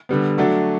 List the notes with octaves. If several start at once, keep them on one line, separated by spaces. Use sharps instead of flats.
D3 G3 B3
F#3 A3 D4 F#4 A4